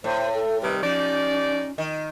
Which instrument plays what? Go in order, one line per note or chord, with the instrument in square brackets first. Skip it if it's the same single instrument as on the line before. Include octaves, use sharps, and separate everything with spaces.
[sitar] A2 [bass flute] C5
[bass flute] A4
[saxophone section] C3 D#3 G3 [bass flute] B4
[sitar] F3 [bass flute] C#4 [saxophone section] D#4 G4 D5
[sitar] D#3